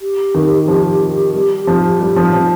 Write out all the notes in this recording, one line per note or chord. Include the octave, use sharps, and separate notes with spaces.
G4
D#3
F3
G3
F3
G3
F3
F3